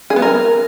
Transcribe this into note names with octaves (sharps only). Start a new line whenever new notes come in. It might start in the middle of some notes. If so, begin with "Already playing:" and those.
G#4
B3
A#4